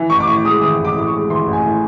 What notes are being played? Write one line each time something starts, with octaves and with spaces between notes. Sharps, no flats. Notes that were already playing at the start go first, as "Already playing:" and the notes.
Already playing: E3
A1 C#6
D6
A2 C#6
G#3 D#6
E3 D#6
A1
D6
A2 D6
C#6
G#3
E3 C6
A1
G#5
A2